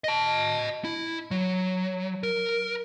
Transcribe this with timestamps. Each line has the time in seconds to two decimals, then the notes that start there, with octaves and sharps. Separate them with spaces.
0.04 D#5 A5
0.84 E4
1.31 F#3
2.23 A#4